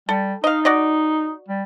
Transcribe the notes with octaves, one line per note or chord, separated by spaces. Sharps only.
G3 A4
D#4 D#5 F5
F#4 D5 D#5
G3